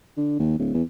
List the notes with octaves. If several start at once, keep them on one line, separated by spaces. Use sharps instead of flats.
D3
D#2
D1
E2